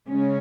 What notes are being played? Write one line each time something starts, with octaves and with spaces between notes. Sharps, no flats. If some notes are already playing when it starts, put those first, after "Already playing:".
C#3 G#3 C#4